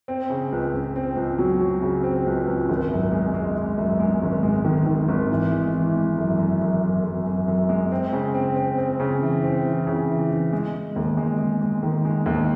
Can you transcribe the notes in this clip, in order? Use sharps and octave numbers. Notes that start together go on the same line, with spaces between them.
C4
C#3
C#2
C#2
C4
C#2
F#3
F#3
C#3
C4
C#2
C#2
G#1
F#2
G#3
G#3
G#3
F#2
G#3
G#1
G#3
D#3
D#3
G#1
E3
G#3
E3
G#3
F#2
F#2
F#2
F#2
F#2
F#2
F#2
G#3
C4
C#3
C4
C4
C4
C#3
E3
C4
E3
C#3
E3
E3
G#3
G#3
D#2
G#3
G#3
G#3
D#3
G#3
D#2